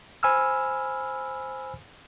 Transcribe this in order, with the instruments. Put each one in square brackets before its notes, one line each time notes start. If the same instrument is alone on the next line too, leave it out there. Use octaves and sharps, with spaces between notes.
[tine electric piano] C5 G#5 B5 E6 F6